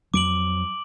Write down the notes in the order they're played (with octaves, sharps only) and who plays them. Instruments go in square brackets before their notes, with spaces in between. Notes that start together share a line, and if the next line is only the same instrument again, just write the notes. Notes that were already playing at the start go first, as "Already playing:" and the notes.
[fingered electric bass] F2 F#3 [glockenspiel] D6 D7 F#7